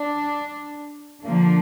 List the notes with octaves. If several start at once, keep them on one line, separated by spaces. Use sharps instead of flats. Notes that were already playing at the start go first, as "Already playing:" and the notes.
Already playing: D4
D3 F3 A#3 D4